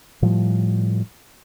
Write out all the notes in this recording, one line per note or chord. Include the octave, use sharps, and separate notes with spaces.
A2 F3 G3